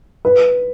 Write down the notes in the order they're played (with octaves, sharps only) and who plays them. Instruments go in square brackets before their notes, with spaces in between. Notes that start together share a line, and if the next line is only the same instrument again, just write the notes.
[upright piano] B4